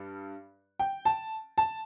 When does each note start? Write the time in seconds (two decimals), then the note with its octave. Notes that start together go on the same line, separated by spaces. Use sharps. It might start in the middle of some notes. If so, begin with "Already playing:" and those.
Already playing: G2 G3
0.79 G5
1.05 A5
1.58 A5